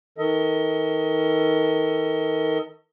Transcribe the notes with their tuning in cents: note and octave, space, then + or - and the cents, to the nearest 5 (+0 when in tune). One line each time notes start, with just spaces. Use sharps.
D#3 +35 A4 +40 D#5 +35